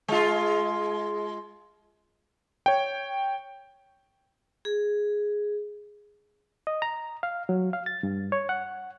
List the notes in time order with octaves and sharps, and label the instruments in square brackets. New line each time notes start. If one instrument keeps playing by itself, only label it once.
[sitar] G#3 F4
[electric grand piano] C#5 G5
[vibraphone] G#4
[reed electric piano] D#5
A#5
F5
F#3
F5
A6
G2
C#5
F#5